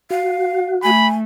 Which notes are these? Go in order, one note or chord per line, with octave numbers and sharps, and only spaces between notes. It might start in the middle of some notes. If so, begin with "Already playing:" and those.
F#4 F5
A3 G#5 B5